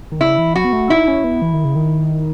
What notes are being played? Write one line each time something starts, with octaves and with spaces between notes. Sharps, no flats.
D#3
C#3 E4
E3
F#3 F#4
B3
A3
D#4 E4
C#4
B3
E3
D#3
C#3
D#3